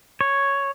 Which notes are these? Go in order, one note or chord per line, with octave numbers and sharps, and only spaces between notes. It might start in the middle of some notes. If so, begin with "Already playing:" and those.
C#5